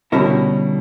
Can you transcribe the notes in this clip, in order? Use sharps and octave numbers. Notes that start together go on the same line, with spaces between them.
B2 D3 G3 C#4 E4 A#4